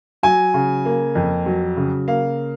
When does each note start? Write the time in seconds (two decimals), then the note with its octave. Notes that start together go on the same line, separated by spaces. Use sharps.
0.23 F#3 G#5
0.54 C#3
0.85 A#3
1.15 F2
1.46 F#3
1.77 C#3
2.07 A#3 F5